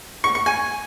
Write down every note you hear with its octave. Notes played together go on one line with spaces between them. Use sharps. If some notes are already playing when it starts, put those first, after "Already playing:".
C#6
C#6
G#5